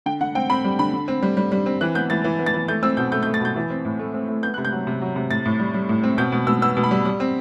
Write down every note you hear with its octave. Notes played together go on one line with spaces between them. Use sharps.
D3 G5
D3 F#5
C4 G5
C4 B5
G3
D3 B5
D3
C4
G3
G3
G3
C4
E3 F#6
B3 G6
E3 A6
E3
B3
A6
E3
A3 G6
C4 E6
B2 G6
A3 G6
G6
A3
A6
B2 G6
E3
C4
A2
A3
C4
A3
B3 G6
C3 F#6
G6
F#3
C3
F#3
C3
A2 A6
A2
G3
G3
A2
C4
B2 G6
B2
B2 E6
B3 E6
B2
B5
G3
G3
C4